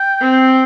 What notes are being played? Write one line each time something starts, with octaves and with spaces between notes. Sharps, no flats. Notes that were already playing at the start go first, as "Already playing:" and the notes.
Already playing: G5
C4